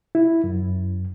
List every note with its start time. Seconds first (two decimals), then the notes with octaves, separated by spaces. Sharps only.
0.15 E4
0.44 F#2